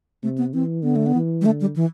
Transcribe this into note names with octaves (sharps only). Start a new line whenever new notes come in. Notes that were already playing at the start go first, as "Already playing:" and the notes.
C3 A3
B3
E3 C4
D3 B3
A3
B3
E3
G3
D3 A3
G3
E3